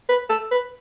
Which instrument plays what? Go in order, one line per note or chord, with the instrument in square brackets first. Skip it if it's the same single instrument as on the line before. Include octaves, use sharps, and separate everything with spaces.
[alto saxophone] B4
A4
B4